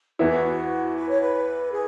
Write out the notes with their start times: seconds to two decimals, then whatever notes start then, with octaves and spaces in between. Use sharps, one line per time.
0.19 E2 E3 B3 E4 F#4
0.95 B4
1.08 C#5
1.21 B4
1.71 G#4